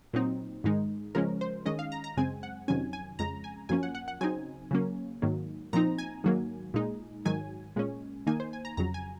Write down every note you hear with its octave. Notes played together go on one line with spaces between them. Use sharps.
A#2 F#3 C4 D#4
G#2 D#3 G#3 D#4
C#3 F3 G#3 C#4 A#4
C5
D#3 G#3 C#4 D#5
F5
A#5
A#5
F#2 C#3 G#3 C4 G#5
F#5
F2 C3 D#3 F#3 C#4 G#5
G#5
F2 C#3 G#3 A#5
G#5
F#2 F3 A#3 C#4 G#5
F#5
F#5
F#5
C#3 F#3 C4 D#4 G#5
C#3 F#3 A#3 C#4
G#2 D#3 F#3 A#3
A#2 F3 C4 D#4 A#5
G#5
G#2 D#3 F#3 A#3
A#2 G#3 D#4
G#2 D#3 F#3 G#5
A#2 G#3 C#4
D#3 A#3 D#4 G#5
C5
G#5
A#5
F2 C#3 F#3 A#5
G#5